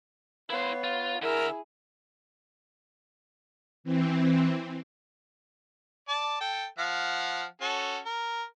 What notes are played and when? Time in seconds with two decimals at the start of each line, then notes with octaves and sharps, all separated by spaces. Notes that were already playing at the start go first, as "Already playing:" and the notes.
0.50 B3 E4 C5 C#5 F5
0.84 F4
1.22 D3 E4 G#4 A#4 E5
3.84 E3 C4
6.08 D5 A5
6.41 A4 G5
6.78 F3 F5 F#5
7.61 C#4 F#4 A4
8.06 A#4